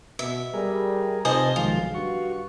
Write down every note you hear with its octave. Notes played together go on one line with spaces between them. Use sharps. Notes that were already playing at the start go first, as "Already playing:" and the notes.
B2 E5
G3 G#4 A#4
C3 D#4 F4 G#4 C5 D#5 A5
B1 D#3 F3 G#3 F4
G2 F#4 C#6